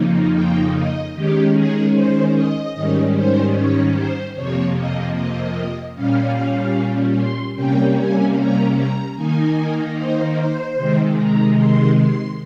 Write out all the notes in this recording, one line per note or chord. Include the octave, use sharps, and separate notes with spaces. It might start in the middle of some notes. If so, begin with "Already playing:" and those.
Already playing: F2 C#3 F3 A#3 D#4
G5
D#5
D#3 G#3 C#4 G4
G#4
C5
D#5
G#2 D#3 G3 C#4
C5
C#5
C5
F2 C3 F3 A#3 C#5
D#5
D#5
A#2 G3 C#4 F5
C6
C3 G3 A#3 C#4 G5
G#5
A#5
A#5
D#3 A#3 D#4 G#5
C5
C5
C3 D#3 G#3
A#5
C6
C6